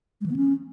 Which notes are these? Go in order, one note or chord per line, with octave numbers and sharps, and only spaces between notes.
G#3
E3
B3
C#4